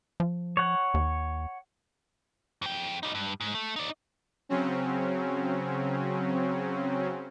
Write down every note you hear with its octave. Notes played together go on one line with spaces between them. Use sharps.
F3
C#5 F#5
D#2
F2 G5
G3 D#4
G2
G#2
A3
D#4 D5
C#3 F#3 C4 C#4